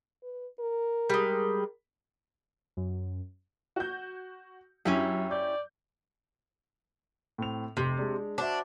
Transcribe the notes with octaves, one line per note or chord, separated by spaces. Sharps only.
B4
A#4
G3 G#3
F#2
F#4 G6
F#2 C#4 E4 G4
D5 G6
A2 C4 F7
F1 C3 C6
G#3 D4
D4 F#4 C5 E5